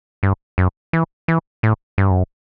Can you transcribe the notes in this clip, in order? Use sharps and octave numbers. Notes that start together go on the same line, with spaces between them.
G2
F#2
E3
E3
A2
G2
F#2